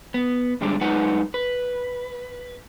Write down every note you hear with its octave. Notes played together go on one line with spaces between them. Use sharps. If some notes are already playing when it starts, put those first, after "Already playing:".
B3
G2 D3 G3 G#3 D4
F#2 G#3 D#4 B4 F#5
B4